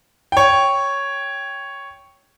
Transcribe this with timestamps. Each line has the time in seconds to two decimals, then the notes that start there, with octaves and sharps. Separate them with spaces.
0.32 C#5 G5